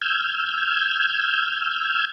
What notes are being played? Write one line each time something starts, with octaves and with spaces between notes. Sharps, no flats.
E6 F6 G6 G#6